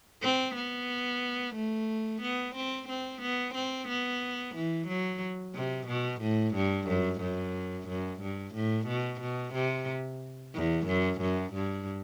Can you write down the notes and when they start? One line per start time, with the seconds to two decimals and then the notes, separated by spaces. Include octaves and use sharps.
0.23 C4
0.55 B3
1.55 A3
2.22 B3
2.56 C4
2.89 C4
3.22 B3
3.54 C4
3.88 B3
4.55 E3
4.88 F#3
5.55 C3
5.88 B2
6.22 A2
6.55 G2
6.88 F#2
7.21 F#2
7.88 F#2
8.20 G2
8.55 A2
8.87 B2
9.21 B2
9.54 C3
10.54 E2
10.87 F#2
11.21 F#2
11.54 G2